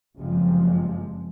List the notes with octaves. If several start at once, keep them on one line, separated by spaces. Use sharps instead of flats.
F#1 C3 F3 G#3